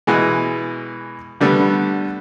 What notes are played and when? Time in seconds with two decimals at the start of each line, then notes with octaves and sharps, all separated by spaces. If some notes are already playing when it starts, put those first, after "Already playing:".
0.07 B2 E3 G#3
1.40 D3 G3 A3 B3